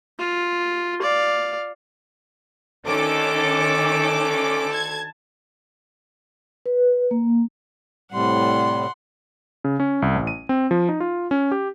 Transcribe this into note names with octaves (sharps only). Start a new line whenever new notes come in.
F4
D5 F5
D2 D#3 C#4 A4 D6
A5 G#6
B4
A#3
A2 C3 G3 F#5 C6
C#3
C#4
C2
A1
D#7
C4
F3
D#4
F4
C#4
G4